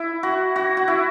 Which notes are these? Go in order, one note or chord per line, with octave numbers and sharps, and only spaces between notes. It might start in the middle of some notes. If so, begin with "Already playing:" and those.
Already playing: E4
F#4
F#4
F#4
E4